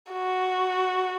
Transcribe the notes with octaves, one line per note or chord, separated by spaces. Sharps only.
F#4